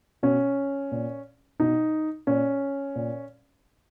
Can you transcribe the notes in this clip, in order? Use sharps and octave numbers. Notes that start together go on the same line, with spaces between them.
B2 C#4
A#2
B2 D#4
A#2 C#4
A#2